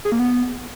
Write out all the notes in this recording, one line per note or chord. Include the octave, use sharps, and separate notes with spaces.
G#4
A#3
B3